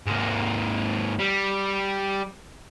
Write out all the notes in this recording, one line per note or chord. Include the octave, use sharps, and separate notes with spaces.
G#2 A#3
G3